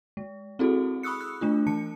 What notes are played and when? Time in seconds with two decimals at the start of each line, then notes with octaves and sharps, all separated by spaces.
0.17 G#3
0.59 C4 E4 F#4 G#4 A4
1.03 B5 C#6 D#6 E6 F#6 C#7
1.21 F#6
1.41 A3 D4 F4
1.67 E3 A5 C#7